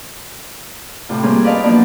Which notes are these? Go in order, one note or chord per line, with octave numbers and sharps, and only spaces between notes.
A2 C3 F4
G3 A#3 C4 C#4 G#4
B4 D5 D#5 F5 A5
F3 F#3 A#3 B3 D4 D5